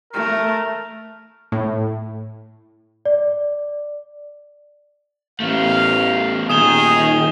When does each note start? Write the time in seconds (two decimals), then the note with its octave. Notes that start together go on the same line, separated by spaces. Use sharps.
0.13 A3 A#4
1.52 A2
3.05 D5
5.40 A1 A3 B3 F5
6.50 D#1 D#3 G#4 D#6 E7 G7